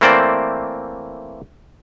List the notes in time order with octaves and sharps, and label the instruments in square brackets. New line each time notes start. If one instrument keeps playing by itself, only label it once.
[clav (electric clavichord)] E3 A3 A#3 C4 C5 D5